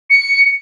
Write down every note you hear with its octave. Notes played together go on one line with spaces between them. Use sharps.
C#7